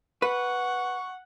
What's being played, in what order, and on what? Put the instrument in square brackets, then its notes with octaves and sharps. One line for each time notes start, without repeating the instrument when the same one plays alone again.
[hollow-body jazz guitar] B4 [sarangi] F#5 [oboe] C#6